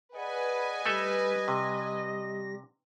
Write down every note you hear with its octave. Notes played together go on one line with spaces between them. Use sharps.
G#4 B4 D5 D#5 F#5 G#5
G3 A3 G4 A4 E5 A#6
C3